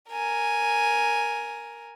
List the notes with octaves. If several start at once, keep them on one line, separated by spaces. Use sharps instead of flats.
A#4 G#5